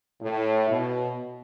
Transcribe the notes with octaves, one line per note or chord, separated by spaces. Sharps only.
A2
B2